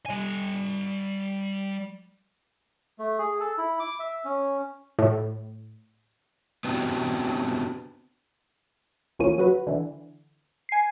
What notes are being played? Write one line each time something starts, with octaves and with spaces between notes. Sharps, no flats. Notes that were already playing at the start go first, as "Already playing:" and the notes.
G3 G#5
A3
G#4
A4
E4
D6
E5
C#4
A2
B3 C4 D4 E4 F#4 G4
D2 E3 F3 A#3 C#4 D#7
F#3 F#4 B4
D3 E3
G#5 C7